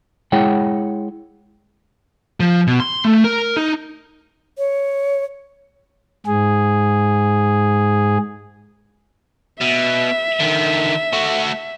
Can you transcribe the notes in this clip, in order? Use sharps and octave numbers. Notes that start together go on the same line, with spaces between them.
G#3 E4 G#4 C#5 F#5 G5
F3
B2
C6
A3
A#4
D#4
C#5
G#2 G#4
B2 E5
D3 D#3
A3 F#4